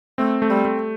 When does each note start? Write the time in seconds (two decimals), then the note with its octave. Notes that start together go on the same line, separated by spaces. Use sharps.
0.18 A3 C4
0.42 A3
0.50 G3
0.65 A3